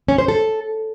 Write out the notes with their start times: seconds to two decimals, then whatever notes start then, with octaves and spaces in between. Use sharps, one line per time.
0.08 C#4
0.18 C5
0.28 A4